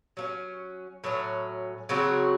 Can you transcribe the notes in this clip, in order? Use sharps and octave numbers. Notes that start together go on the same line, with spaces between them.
F#3 A3 C#4
A2 F#3 A3 C#4
C#3 F#3 C4 F#4